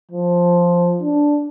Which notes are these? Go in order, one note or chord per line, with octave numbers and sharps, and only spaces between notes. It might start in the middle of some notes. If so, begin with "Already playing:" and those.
F3
D4